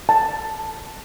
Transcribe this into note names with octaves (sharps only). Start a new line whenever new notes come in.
A5